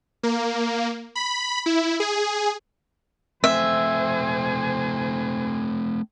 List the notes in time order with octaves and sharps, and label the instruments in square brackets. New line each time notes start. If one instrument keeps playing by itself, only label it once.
[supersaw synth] A#3
B5
E4
G#4
[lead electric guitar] A3 C4 [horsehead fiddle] C5 G#5 [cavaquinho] E5